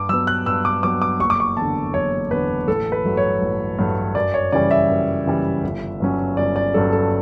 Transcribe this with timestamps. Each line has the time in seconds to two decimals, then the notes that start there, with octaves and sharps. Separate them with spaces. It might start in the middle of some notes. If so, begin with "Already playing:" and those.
Already playing: G2 D6
0.09 F#3 B3 E6
0.27 F#6
0.46 G2 E6
0.65 D6
0.83 F#3 B3 D6
1.02 D6
1.20 F#1 C#6
1.30 D6
1.40 C#6
1.57 E2 A5
1.62 D3
1.94 F#1 C#5
2.31 E2 D3 B4
2.68 A1 A4
2.92 B4
3.05 G2 F#3 A3
3.17 C#5
3.42 A1
3.78 G2 F#3 A3
4.15 F#2 D5
4.34 C#5
4.52 C#3 E3 G3 D5
4.71 E5
4.89 F#2
5.26 C#3 E3 G3
5.63 G1
6.00 G2 F#3 C#4
6.37 G1 D5
6.56 D5
6.74 G2 F#3 C#4 A4
6.92 A4